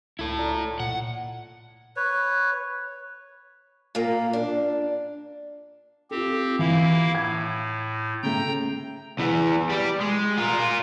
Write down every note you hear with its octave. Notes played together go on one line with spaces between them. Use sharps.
C#2 E4 A4
F4 D5 A#5
A#2 F#5
B4 C#5
A#2 A#3
D4
C4 F4 G4 A4
E3 A#3 E4 F5
A2 G#6
C#3 A3 G5 A#5 G6
E2 E3
G3 G4
G#3
F4 A#4